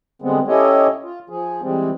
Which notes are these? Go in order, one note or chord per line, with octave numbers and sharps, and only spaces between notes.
D3 G3 G#3 B3 C4
C#4 E4 G4 A4 C#5 D#5
F4
F3 G#4
E3 G3 G#3 C4